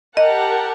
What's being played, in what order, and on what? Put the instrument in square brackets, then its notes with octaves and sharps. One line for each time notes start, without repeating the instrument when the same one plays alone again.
[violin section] G4 A#4 F#5 A5 [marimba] D#5